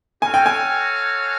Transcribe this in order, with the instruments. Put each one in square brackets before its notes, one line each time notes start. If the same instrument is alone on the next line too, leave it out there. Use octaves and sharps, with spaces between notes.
[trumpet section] F#4 A4 C#5 F5 [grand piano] G#5
[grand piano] G5
G#5